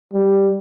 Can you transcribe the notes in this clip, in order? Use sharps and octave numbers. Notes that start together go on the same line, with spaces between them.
G3